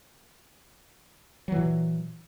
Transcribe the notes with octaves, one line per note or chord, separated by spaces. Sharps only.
A#2 E3 F#3